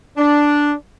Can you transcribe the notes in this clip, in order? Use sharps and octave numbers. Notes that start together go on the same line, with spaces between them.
D4